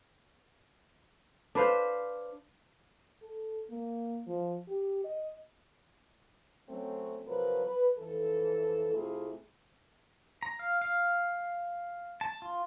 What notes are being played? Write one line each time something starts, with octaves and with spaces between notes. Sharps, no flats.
D4 B4 C5 F5
A4
A#3
F3
G4
D#5
F#3 A3 C4 C#4 A4
C3 F3 F#3 A#4 B4
B4
F2 E3 A4
C3 A3 E4 F4 G#4
A#5
F5
F5
A5
F4